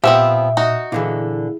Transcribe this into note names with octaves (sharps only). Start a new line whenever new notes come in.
A#2 F3 B3 C4 G4 E5 F#5
D#4 F#4
A#2 D3 E3 E4 G#4